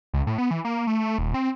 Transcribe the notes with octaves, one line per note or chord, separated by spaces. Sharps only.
C#2
A2
B3
E3
A#3
A3
A3
D#1
C4